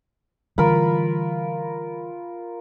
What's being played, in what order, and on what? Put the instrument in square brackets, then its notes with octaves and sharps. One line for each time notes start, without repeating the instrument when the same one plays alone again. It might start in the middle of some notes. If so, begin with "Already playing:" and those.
[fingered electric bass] D3 E3 G3 [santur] F4 A#4 B5